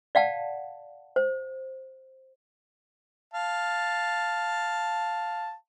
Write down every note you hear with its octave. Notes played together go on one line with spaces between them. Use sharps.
D5 F5 F#5 A5
C5
F5 A5